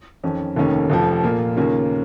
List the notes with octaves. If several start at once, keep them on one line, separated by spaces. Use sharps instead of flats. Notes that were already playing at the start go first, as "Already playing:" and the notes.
F2 D#3 C#4
F1 D#2 D#3 A#3 C#4
F1 F2 F3
A#2 A#3 F4
D#2 C#3 A#3 C#4 F4